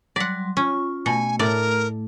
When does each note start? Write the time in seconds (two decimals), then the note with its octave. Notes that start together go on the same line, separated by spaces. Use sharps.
0.16 F#3 G3 D5 F#5 C6
0.57 C#4 F4 C#6
1.06 B2 A3 G#5
1.39 A2 A#4 D5